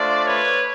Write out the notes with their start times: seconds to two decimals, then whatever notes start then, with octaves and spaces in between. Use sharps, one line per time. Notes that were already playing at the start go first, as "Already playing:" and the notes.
Already playing: A3 D4 F4 C5 D5
0.26 B4 C#5